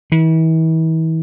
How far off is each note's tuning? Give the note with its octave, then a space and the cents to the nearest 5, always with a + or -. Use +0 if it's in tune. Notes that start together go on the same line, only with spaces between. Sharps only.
E3 -40